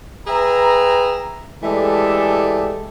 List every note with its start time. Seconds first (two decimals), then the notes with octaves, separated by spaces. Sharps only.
0.27 G#4 B4 E5 G5 A#5
1.63 E3 G#3 A3 G4 A4 D5